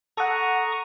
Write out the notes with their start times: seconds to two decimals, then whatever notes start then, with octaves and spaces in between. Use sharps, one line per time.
0.17 A4 F#5 A#5 C#6 D#6